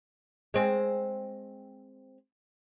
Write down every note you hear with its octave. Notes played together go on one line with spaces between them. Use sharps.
G#3 C4